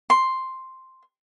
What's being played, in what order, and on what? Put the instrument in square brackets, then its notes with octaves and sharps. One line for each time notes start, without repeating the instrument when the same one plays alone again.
[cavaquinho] C6